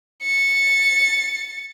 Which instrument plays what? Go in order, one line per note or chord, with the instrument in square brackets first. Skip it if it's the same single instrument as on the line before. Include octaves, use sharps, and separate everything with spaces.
[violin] A6 C#7